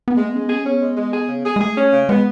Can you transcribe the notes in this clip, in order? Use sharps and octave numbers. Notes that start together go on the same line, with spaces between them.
B3
G#3 A3
B3
G#3 C#4
B3
C#4 G#4
B3 C#4
G#3
G#3
G#4
C#3
G#4
G#3
A3 G#4
C#4
C#3
G#3 B3